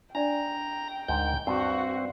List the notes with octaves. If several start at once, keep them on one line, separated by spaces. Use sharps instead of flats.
D4 D5 G5 A#5
D2 G#2 A#4 G6
G2 C4 F#4